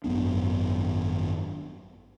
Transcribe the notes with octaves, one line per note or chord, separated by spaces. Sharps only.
G#1 F#2 B3 D4